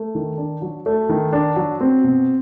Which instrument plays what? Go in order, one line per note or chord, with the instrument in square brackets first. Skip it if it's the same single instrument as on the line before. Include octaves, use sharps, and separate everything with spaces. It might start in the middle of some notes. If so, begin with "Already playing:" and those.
Already playing: [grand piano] A3
D#3
D4
F#3
A3
D#3
D4
F#3
C4
B2